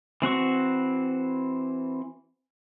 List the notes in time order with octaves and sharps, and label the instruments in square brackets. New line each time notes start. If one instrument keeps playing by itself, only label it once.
[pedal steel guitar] E3 C4 F#4 C#6